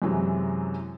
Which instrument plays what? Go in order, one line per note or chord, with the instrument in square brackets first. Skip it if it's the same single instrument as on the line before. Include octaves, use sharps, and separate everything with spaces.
[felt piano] F#2 C3 E3 F#3 G#3